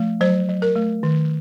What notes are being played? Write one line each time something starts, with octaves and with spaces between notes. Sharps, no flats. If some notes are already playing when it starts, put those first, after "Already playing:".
Already playing: F3 A3
F#3 C5
F#3
A#4
A3
D#3